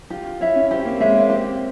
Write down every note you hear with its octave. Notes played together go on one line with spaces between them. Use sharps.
F4 G4
F4
E4 C#5 E5
C#4
C4 G4
A#3
G#3 C#5 E5
A#3
C4 G4